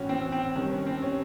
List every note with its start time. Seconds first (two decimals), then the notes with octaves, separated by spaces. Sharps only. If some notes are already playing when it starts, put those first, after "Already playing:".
Already playing: A2 E3 C#4 F#4
0.09 C4
0.32 C4
0.56 G2 D#3 C#4
0.71 C#4
0.87 C4
1.02 C#4